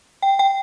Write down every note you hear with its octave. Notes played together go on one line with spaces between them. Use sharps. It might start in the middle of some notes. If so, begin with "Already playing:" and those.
G5
G5